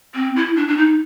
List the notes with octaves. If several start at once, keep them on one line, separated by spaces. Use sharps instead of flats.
C4
E4
D4
D4
D#4